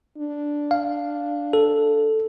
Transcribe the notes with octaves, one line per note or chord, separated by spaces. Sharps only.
D4
F5
A4